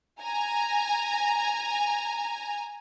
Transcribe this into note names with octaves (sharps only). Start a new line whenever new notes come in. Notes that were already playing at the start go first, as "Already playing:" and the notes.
G#5 A#5